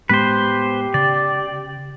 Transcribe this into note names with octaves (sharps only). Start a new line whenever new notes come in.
A2 G#3 B3 G4 B4 C5
C#3 D5